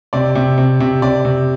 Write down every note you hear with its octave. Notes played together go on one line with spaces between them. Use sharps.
C3 D5
C3
C3
C3
C3 D5
C3